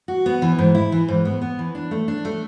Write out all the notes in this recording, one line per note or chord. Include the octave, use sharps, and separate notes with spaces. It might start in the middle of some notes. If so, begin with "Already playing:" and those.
F#4
B3
E3
G#2
E4
E3
G#2
B3
B3
E3
D4
A3
D4
A3